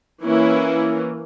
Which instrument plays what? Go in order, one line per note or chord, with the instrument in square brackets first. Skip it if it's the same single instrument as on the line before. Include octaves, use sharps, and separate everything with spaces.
[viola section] E3 A#3 C#4 E4